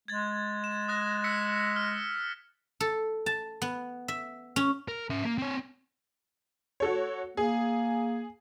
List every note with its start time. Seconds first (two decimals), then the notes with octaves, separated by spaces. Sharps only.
0.08 G#3 G#6 A6
0.64 E7
0.88 D#6 F#6 A#6
1.24 E6 B6 C#7
1.76 F6
2.80 A4
3.26 A5
3.62 B3
4.08 E5
4.56 C#4
4.88 A#4
5.10 C#4 E5
5.25 A#3
5.38 C4 C#5
6.80 F#4 A4 C#5
7.37 A#3 G#4